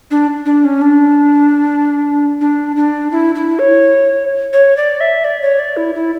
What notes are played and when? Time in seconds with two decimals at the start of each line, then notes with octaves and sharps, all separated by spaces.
0.11 D4
0.45 D4
0.64 C#4
0.81 D4
2.41 D4
2.76 D4
3.12 E4
3.35 E4
3.59 C#5
4.53 C#5
4.77 D5
5.00 E5
5.24 D5
5.42 C#5
5.59 D5
5.77 E4
5.95 E4